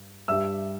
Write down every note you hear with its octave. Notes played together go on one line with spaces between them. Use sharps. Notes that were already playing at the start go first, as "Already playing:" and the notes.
Already playing: G2
G2 G3 E5 E6